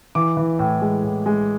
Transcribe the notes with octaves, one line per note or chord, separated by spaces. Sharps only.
E3 D6
E3
A2
G#3
A2
G#3